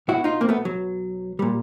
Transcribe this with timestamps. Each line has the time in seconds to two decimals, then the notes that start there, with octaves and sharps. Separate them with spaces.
0.08 B1 B2 E4 F#4
0.24 D#4 F4
0.41 A#3 C4
0.49 A3 B3
0.65 F#3
1.39 A#2 G3